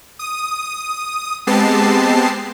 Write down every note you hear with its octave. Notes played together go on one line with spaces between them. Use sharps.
D#6
G#3 B3 C4 G4 A5 C7